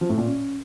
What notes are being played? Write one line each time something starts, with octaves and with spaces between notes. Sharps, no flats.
F3
A2
A#2
C#4